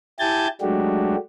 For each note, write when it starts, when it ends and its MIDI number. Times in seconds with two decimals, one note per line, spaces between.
0.19 0.47 64
0.19 0.47 67
0.19 0.47 80
0.19 0.47 81
0.19 0.47 91
0.19 0.47 93
0.61 1.16 54
0.61 1.16 56
0.61 1.16 57
0.61 1.16 62
0.61 1.16 66
0.61 1.16 67